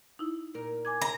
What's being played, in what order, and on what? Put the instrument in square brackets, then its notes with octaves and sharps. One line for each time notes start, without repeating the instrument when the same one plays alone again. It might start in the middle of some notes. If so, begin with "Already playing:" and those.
[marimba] D#4 E4
[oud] A#2 A#4
[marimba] G#5 D6 G#6
[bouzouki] A#5